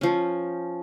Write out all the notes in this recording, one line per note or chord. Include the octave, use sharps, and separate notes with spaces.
F3 C#4